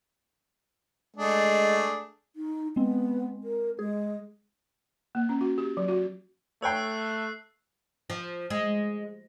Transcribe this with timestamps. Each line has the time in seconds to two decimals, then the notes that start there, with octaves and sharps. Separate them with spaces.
1.17 G#3 A3 D4 G#4
2.36 D#4
2.76 G#3 B3 C4
3.44 A#4
3.79 G#3 G#4
5.15 A#3
5.29 C#4
5.41 F#4
5.58 G4
5.77 F#3
5.88 F#4
6.62 A3 C#5 G5 E6 F#6 C7
8.10 F3
8.50 G#3